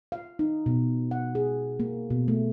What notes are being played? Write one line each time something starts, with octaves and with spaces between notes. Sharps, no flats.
F5
D#4
B2
F#5
G#4
A#3
B2
A3